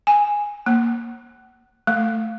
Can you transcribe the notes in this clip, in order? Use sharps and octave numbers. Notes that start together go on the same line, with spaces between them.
G#5
A#3
A3